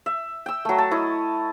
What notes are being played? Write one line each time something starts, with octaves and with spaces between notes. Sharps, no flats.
E5
G5 E6
F#3 A3
A5
E4 C#5 D#5